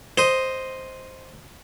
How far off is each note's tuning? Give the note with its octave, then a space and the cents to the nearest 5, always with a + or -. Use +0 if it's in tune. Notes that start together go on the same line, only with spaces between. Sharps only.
C5 +0 D#5 +0